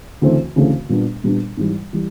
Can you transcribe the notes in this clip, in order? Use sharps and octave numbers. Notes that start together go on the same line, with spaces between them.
D2 C#3 E3 A3 C4
D2 C#3 E3 A3 C4
A#2 G3 B3 D4
A#2 G3 B3 D4
G#2 E3 G3
E3 G3